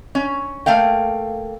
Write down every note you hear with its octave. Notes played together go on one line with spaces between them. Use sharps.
C#4
A3 A#3 F5 G5